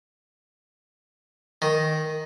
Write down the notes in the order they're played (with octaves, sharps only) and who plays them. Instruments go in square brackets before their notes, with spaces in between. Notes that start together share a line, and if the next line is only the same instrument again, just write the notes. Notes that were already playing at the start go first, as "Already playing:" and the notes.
[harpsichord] D#3